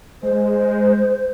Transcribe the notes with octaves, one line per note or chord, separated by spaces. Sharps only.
G#3 C5